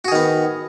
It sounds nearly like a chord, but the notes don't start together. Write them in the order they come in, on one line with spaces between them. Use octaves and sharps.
F#4 G#4 D#3 B3